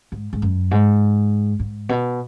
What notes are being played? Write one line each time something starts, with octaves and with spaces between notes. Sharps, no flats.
G#2
G#2
F#2
G#2
G#2
B2